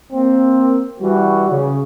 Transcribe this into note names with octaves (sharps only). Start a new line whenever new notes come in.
A#3 C4
E3 G3 F#4
C#3